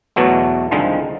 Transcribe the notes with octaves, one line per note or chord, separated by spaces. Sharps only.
E2 B2 E3 F#3 A3
C2 G#2 D3 D#3 F3 G#3